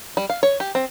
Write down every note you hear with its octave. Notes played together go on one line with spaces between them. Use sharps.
G3
F5
C#5
G4
C4